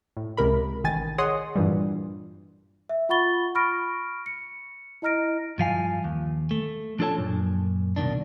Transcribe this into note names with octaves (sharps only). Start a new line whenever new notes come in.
A2
C#2 C3 A#4 B5
A1 D#3 G#5 A6
G#4 C#5 D#5 F#5 C6 D#6
G2 A#2 E3 G3
E5
F4 F#5 B5 C#6 A6 G7
B5 C#6 F6 A#6 D7
C#7
E4 D#5 A#5 F6 A#6 D7
G2 F3 F5 G#5
D#2
A3
F3 D4 F4 A4 C#5 A5
F#2 A#2
C2 B2 D#3 D4